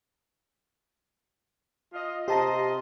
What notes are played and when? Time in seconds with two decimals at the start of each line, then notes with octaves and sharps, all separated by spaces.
1.94 F4 D#5
2.28 C3 G4 C5 D#5 A5 A#5